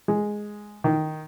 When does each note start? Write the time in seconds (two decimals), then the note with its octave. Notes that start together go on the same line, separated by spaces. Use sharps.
0.08 G#3
0.84 D#3